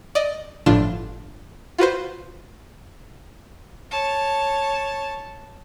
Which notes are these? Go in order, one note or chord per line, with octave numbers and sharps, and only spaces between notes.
D5 D#5
G1 A2 F3 D4 F4 E7
F4 F#4 B4 C5
C#5 A5